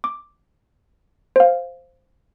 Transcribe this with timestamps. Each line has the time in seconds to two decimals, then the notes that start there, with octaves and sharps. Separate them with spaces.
0.04 D6
1.36 C5 F5